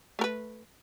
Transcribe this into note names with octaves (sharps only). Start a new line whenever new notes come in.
A3 A#4 B4